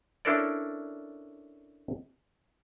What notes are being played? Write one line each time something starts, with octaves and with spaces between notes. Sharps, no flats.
C#4 D4 E4 A4 A#4 D5